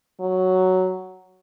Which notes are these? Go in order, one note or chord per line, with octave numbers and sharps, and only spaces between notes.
F#3